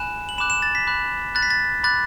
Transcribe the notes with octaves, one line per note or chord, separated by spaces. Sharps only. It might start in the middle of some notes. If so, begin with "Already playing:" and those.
Already playing: G#5 B5 F#6 E7
F#7
B5 D6 F#6 E7
E7
A6
B6
B5 D6 F#6
B5 F#6 A6
B6
A6
B5 D6 F#6 A6